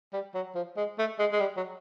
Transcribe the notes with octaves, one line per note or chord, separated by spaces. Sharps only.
G3
F#3
F3
G#3
A3
G#3
G#3
G3
F#3